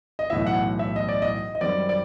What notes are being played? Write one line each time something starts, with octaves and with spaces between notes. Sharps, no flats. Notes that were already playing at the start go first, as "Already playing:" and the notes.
D#5
B1 A2 E3 E5
F#5
E5
D#5
D5
D#5
D#5
F#2 D#3 G3 C4 D5
D5